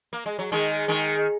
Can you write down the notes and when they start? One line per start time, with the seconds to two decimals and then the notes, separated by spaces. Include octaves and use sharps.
0.13 A#3
0.26 G#3
0.39 F#3
0.52 D#3 G#3
0.88 D#3 G#3